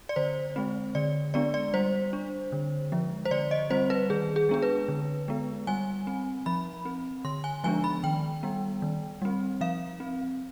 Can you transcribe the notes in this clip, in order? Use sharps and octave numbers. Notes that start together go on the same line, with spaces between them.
D5
D3 C5
G#3 C4
D3 D5
G#3 B3 D4 D5
D5
G3 C5
D4
D3
F3 G#3
C5
D3 D5
D#5
G3 C4 C5
B4
D#3 G#4
G#4
G#3 B3 D4 G#4
B4
D3
G#3 B3
G3 G#5
C4
F3 B5
C4
D3 C6
G#5
F3 G#3 B3 D4 G#5
B5
D#3 G5
G3 B3
D#3
G3 C4
F3 F5
C4